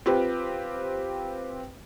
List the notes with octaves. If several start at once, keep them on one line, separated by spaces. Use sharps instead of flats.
C4 F4 G4 B4